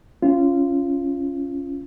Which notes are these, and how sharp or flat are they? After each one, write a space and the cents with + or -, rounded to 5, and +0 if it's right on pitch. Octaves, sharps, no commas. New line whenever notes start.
C#4 +0 F4 -20